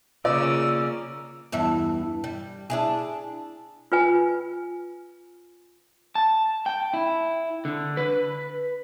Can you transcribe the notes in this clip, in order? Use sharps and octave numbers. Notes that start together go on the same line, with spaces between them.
C#3 A#3 F4 D5 E6
E2 G2 E4
G3
D4 E4 G#4
F4 B4 G#5
A5
G5
E4
D3
B4